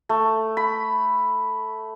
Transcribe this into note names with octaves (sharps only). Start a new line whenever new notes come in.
A3
B5